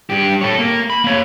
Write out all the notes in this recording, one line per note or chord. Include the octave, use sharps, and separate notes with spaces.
G2 G4
A4 C#5
A#3
B5
A#3 C#5